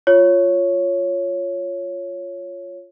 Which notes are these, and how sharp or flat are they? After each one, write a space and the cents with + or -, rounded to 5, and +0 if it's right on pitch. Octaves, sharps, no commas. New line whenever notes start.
F4 +0 C#5 +0